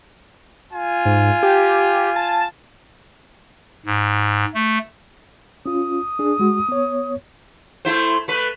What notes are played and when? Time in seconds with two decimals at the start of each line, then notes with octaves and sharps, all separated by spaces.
0.71 F4 G#5
1.05 G#2
1.43 G4
2.16 A5
3.86 G#2
4.54 A3
5.66 C#4 F4 D#6
6.19 D4 G#4
6.39 G#3 F#4
6.69 B3 C#5
7.85 A3 E4 C5
8.28 A3 B4